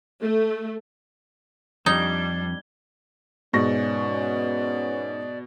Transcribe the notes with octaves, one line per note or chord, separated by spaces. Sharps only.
A3
F2 G3 D4 D#4 G#6 G7
G#2 B2 B3 C#4 D5 C#6 A#6